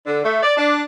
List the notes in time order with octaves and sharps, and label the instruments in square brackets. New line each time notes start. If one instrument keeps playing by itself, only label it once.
[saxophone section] D3
A3
D5
D4